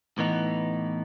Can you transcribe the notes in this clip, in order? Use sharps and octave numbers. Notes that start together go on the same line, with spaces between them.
A2 E3 B3 D#4